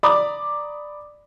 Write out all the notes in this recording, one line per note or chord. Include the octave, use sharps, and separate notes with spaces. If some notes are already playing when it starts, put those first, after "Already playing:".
D5 A#5 B5 D6 D#6